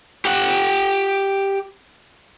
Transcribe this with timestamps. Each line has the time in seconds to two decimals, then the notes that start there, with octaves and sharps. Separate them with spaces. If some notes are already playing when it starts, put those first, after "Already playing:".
0.25 G4 F#5